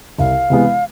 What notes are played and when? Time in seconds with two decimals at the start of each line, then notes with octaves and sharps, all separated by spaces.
0.18 C2 F5
0.50 C3 E3 G#3 B3